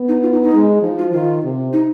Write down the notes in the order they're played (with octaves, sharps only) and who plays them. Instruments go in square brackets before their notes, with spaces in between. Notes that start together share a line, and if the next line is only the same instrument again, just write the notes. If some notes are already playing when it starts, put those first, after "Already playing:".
Already playing: [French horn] B3
[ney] D#4
F4
D#4
D#4
[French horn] G#3
[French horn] F3 [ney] D#4
[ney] F4
[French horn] D#3 [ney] F4
[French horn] C3
[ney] D#4